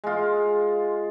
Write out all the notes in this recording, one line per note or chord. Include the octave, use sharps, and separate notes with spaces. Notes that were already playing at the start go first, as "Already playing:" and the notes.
G#3 F4